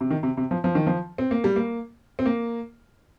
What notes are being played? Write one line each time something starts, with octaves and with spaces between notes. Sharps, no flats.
C3
D#3
C3
C3
F3
F3
D#3
F3
C4
A#3
G3
A#3
C4
A#3